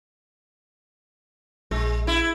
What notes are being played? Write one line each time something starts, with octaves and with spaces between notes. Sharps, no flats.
A#1 G#3
E4